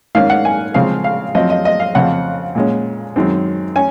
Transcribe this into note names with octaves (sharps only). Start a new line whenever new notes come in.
G#2 D#3 A#3 C#4 F5
F#5
G#5
C#3 F3 G#3 C4 F5
F5
F#2 F3 C4 D#5
D#5
D#5
F5
F2 C#3 F3 C4 F#5
A#2 G#3 C#4
F#2 D#3 G#3 C4
C#4 G#5